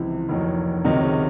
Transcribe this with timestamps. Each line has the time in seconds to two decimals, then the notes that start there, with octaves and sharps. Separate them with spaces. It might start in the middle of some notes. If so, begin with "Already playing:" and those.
Already playing: C#2 C3 E3 F3 E4
0.29 F1 D#2 D#3 F#3
0.84 C#2 C3 D#3 F#3 D#4
1.03 C#3 C#4